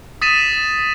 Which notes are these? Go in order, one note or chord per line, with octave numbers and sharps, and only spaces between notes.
D#6 A6 B6 D#7 E7